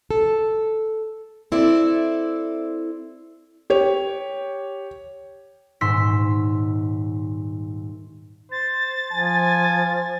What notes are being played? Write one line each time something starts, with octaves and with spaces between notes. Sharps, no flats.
A4
C4 E4 A4 D5
G4 C#5
D#1 G#2 C6 E6 B6
C5 A6
F3 G#5